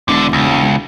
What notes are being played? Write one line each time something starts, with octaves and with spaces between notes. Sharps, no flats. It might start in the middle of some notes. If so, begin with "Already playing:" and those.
E1 F2 D3
C#2